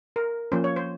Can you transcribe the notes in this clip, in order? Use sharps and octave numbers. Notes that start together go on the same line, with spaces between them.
A#4
F3 A#3 C#4 C5
C#5
C5